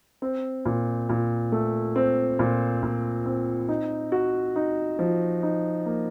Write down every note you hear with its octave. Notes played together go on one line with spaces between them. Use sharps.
C4
A#2
A#2
A3
C4
A#2
A#2
C4
D#4
F#4
D#4
F3
D#4
A#3